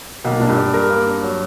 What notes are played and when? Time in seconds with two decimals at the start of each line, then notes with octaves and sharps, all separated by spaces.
0.24 B1 B2 A#3
0.39 A#2 D4
0.49 G2
0.57 D5
0.74 G2 A#4
0.90 A#3
1.07 D4
1.23 F#3